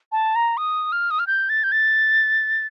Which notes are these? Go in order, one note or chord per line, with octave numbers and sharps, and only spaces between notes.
A5
A#5
D#6
F6
D#6
F6
G6
A6
G6
A6